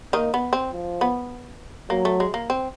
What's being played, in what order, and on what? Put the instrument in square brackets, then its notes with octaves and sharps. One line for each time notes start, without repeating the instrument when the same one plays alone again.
[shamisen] D#3 D#4 [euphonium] A#3
[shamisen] B3
C4
[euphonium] F3
[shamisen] B3
[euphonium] F#3 [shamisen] A#3
[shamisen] A3
G#3
A#3
C4